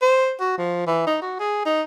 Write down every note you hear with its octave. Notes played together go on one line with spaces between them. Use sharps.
C5
F#4
F3
E3
D#4
F#4
G#4
D#4